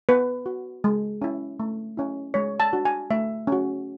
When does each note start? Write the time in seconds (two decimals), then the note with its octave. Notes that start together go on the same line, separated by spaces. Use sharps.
0.09 B3 B4
0.46 F#4
0.84 G#3
1.22 C#4 E4
1.60 A3
1.97 C#4 E4
2.34 G#3 C#5
2.60 A5
2.73 D4 F#4
2.85 G#5
3.10 A3 E5
3.47 C#4 F#4